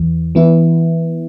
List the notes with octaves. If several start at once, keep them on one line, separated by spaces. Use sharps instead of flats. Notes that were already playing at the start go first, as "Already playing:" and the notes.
Already playing: E2 E3
E3 B3 E4